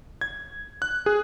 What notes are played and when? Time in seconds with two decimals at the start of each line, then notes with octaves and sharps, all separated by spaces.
0.21 G#6
0.82 F#6
1.06 G#4